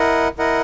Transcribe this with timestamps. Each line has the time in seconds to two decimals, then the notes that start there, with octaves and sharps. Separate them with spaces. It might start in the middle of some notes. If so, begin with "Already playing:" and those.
Already playing: E4 A#4 D#5 F#5
0.38 E4 A#4 D#5 F#5